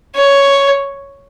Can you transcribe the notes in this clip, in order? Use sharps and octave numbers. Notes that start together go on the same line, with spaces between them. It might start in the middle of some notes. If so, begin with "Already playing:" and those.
C#5